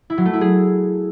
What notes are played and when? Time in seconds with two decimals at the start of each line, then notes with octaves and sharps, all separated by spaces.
0.10 E4
0.18 F#3
0.25 A3
0.33 E4
0.41 G#4